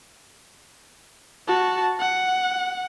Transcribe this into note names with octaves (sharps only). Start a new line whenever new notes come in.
F#4 A5
F#5